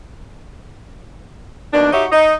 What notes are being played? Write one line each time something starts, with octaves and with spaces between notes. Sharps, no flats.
B2 D#3 A#3 D4
D#4 F#4 G4 C#5 E5
D#4